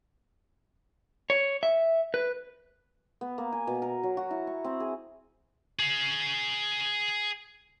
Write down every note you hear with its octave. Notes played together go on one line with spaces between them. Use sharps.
C#5
E5
B4
B3
A#3
G#5
B2
A#4
F#3
F#4
E4
C#6
C4
G#4
G#4 F5